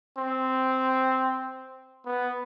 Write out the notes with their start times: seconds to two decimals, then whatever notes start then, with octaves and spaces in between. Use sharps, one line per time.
0.18 C4
2.06 B3